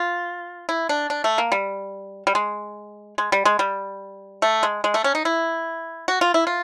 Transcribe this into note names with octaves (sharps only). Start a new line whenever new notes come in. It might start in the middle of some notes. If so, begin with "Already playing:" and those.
Already playing: F4
E4
D4
D4
A3
A#3
G3
G3
G#3
G#3
G3
G#3
G3
A3
G#3
G#3
A3
C#4
D#4
E4
F#4
F4
E4
F4